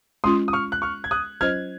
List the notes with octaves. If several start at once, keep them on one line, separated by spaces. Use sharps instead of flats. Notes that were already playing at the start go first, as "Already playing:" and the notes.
G#3 C#4 F4 C6 D#6
D#6
C#6 F6
F#6
C#6 F6
G#6
D#6 F#6
F#3 C#4 F4 C5 D#5 F6 G#6